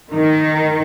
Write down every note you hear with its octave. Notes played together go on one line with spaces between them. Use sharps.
D#3